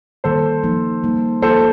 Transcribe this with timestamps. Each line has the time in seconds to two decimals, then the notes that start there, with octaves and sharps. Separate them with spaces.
0.24 D#3 G3 A#3 A4 C5
0.63 F3 A#3 D#4
1.03 G3 A#3 D#4
1.42 F3 A#3 F4 A4 C5